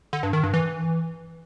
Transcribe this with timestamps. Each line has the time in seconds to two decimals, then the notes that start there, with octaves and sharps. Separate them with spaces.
0.13 D3
0.23 G2
0.33 D#3
0.43 G2
0.54 E3